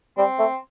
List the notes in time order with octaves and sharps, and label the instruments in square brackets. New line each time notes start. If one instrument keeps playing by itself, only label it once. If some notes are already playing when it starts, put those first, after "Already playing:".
[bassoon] G3 [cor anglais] C4
[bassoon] A3